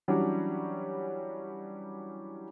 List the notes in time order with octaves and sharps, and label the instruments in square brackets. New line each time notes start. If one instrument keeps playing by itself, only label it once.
[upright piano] E3 F#3 G3 C#4 D4 F#4